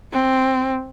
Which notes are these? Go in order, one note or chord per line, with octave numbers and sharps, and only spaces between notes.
C4